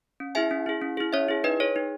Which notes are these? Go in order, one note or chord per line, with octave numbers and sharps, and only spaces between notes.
C#4
E4 G#4 E5 G#5
C#4
E4 G#4
C#4
E4 G#4
C#4 C#5 E5
E4 G#4
D#4 B4 D#5
G#4 C#5
D#4